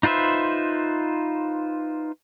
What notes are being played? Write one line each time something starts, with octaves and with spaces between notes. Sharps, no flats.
D#4 F4 B4 C5 E5